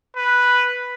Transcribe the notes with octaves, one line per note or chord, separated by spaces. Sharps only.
B4